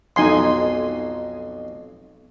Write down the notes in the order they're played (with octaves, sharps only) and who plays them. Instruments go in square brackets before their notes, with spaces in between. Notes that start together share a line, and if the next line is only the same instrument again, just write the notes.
[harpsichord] B1 F2 [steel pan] D#4 G#5 C6